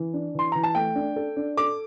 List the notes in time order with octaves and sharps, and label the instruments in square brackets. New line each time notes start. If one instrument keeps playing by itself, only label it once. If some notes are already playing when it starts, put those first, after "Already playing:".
Already playing: [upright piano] E3
D4
[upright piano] E3 [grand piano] C6
[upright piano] E3 [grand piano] A#5
[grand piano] A5
[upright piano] A3 [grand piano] G5
[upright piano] D4
A4
D4
[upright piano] A4 [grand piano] D6